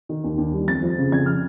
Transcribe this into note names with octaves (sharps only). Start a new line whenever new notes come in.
D#3
D#2
D#2
G3
F2 A6
F3
C#3
F2 G#6
F6